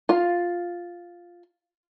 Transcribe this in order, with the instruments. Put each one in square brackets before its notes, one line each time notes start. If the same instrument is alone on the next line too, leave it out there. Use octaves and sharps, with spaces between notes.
[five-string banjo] F4 F5